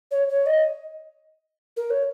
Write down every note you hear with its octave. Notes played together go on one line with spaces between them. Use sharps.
C#5
C#5
D#5
A#4
C#5